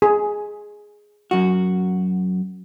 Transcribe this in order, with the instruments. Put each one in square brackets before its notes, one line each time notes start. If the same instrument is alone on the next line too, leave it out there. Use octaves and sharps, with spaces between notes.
[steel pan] G#4
[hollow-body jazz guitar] F#2 F#4